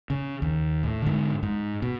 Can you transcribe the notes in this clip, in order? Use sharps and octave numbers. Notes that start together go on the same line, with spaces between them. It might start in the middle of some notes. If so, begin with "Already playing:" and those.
C#3
D#2
A2
G#2 D3
G#2
B2